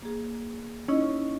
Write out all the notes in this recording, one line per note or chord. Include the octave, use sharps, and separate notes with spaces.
A#3 G#4
C#4 D#4 E4 D#5